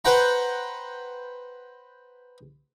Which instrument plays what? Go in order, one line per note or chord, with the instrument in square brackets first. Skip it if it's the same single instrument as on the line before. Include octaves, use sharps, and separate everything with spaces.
[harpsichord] B4 C5 F#5 G5 A#5